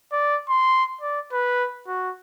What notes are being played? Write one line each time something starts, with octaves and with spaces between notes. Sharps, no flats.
D5
C6
D5
B4
F#4